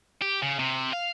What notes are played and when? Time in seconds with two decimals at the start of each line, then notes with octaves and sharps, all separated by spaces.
0.22 G4
0.42 C#3
0.59 C3
0.93 F5